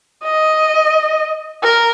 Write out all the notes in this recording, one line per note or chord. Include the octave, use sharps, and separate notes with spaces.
D#5
A#4